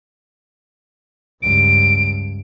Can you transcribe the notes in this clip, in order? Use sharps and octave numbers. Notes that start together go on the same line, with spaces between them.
C#2 G2 D7